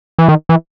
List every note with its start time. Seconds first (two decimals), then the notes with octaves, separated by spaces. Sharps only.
0.19 E3
0.28 D#3
0.49 E3